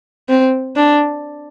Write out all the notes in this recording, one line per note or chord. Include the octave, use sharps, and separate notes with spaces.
C4
D4